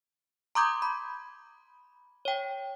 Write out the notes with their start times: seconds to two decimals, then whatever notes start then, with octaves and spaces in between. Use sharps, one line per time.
0.55 A#5 C6 D6 D#6 G6 G#6
0.82 B5
2.25 C#5 G5